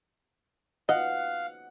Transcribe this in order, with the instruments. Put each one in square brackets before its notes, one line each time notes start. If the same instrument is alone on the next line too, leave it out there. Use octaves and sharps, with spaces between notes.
[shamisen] D#5 [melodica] F5 [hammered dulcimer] F#5